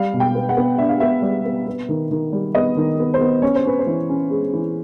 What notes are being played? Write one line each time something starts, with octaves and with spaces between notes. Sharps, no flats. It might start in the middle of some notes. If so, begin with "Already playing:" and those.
Already playing: G3 F5
B2
G5
B3
F#5
B3
D4 E5
F5
B3 E5
G3
B3
B3
D#3
D#3
G3
B3 D#5
D#3
B3
C5
B3
C#4 C#5
C5
C#4 B4
C5
E3
C#4
G#3
E3